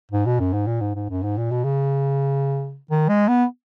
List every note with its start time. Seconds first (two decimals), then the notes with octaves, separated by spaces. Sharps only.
0.11 G#2
0.26 B2
0.40 F#2
0.53 G#2
0.66 A#2
0.81 G#2
0.95 G#2
1.09 F#2
1.23 G#2
1.37 A#2
1.51 B2
1.64 C#3
2.91 D#3
3.09 G#3
3.28 B3